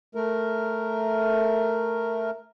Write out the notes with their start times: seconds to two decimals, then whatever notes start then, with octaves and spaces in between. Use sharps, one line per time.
0.15 A3 A#4